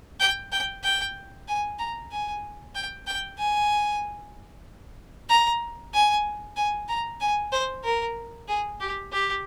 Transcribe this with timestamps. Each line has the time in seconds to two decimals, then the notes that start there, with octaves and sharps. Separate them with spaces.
0.20 G5
0.52 G5
0.84 G5
1.48 G#5
1.79 A#5
2.11 G#5
2.75 G5
3.07 G5
3.38 G#5
5.29 A#5
5.94 G#5
6.56 G#5
6.88 A#5
7.20 G#5
7.52 C5
7.84 A#4
8.48 G#4
8.80 G4
9.12 G4